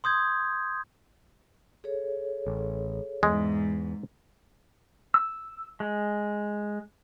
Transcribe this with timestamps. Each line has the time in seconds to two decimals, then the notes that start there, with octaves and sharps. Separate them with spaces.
0.04 C6 D#6 G6 G#6
1.84 G#4 A4 C#5
2.47 A1
3.23 E2 G#2 G#3
5.14 E6
5.80 G#3